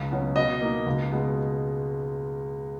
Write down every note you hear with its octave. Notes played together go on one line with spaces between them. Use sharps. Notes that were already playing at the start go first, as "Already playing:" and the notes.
Already playing: C#2
B2 F#3 C#4
B2 D#5
A#3 D#4
C#2
B2 G#3